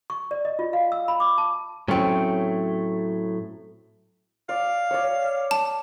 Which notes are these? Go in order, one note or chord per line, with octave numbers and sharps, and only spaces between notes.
C#6
D5
D#5
F4
F5
E6
B5
D6
A5
A2 F#3 A3 C4 C#4
D5 F5
C#5 D5
A5